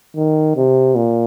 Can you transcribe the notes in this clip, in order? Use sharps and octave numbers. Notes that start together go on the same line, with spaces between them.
D#3
C3
A#2